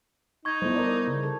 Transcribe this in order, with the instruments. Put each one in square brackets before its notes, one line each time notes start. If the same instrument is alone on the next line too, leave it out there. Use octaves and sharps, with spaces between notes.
[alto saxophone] D#4 [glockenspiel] C#6 G#6
[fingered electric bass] G3 B3 [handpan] E4 A4 C5
[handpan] A#4 D5
[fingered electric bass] C#3
[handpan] A4